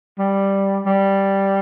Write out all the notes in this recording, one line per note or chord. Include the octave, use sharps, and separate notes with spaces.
G3
G3